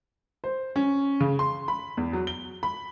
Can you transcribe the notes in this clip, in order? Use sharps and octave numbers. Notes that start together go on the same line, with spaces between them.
C5
C#4
C#3
C6
B5
E2
F#3
G7
B5